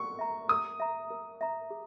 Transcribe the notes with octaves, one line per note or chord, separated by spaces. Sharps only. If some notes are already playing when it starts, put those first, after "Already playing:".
Already playing: C#6
E5 A#5
A#4 D#6
E5 A#5
A#4
E5 A#5
G#4